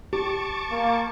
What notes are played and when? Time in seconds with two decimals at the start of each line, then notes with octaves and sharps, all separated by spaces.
0.13 G4 A5 C#6 D6
0.71 A#3